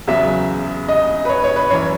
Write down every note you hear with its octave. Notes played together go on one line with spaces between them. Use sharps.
E2 C#3 F#3 E5
D#5
B4
C#5
C#5
B4
F#2 E3 C#5